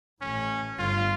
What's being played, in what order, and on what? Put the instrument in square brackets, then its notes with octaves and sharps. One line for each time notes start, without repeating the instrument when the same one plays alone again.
[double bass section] A1 A2 [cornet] C#4
[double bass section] G1 G2 [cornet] F4